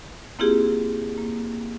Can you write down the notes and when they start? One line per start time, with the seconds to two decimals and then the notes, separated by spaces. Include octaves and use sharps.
0.39 A#3 C4 E4 F4 G4 G#4
1.18 A#3